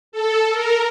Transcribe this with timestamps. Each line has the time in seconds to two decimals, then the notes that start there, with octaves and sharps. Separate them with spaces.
0.12 A4
0.52 A#4